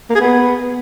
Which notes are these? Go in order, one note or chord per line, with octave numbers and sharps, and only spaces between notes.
A#3
G#4
B3